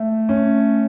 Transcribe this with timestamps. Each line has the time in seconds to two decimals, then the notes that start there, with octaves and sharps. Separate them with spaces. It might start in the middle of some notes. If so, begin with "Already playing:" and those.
Already playing: A3
0.29 C#4